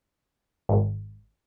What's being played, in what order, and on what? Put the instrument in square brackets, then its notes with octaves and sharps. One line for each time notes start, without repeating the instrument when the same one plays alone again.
[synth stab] G#1